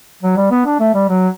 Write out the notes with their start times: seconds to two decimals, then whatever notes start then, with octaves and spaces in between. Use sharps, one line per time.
0.23 F#3
0.37 G3
0.51 B3
0.66 D4
0.80 A3
0.94 G3
1.09 F#3